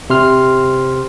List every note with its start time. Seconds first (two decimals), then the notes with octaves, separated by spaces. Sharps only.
0.10 C3 C6 F6